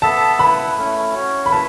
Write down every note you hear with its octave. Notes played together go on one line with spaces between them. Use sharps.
B3 A4 E5 A5
E4 B4 F#5 B5
A3 C#4 E4
C#4 F#4 C#5
B5
E4 B4 E5 A5